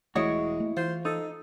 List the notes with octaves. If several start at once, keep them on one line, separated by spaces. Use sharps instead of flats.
E1 E3 G#3 A3 E4 F#4 C#5 D#5
A3 A#3
E3 F4 C5
D#4 A4